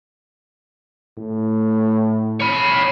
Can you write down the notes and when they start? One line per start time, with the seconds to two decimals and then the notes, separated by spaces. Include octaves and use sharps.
1.18 A2
2.40 C#5 B5